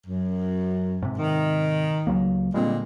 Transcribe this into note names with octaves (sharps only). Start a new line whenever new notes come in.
F#2
G#2 C3
D#3
C#2 F#3 A#3
A#2 D3 G3 G#3 C4